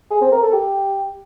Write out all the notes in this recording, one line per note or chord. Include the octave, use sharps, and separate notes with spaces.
G#4
C4
A#4
A4
G4